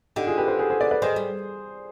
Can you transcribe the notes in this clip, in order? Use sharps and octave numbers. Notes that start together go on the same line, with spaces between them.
D3 D#4 G4
F4 G#4
G4 B4
G#4 C5
G#4 C5
G#4 C5
B4 D5
B4 D5
D#3 G#4 C5
G3